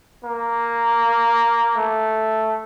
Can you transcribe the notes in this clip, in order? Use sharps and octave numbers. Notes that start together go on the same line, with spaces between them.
A#3
A3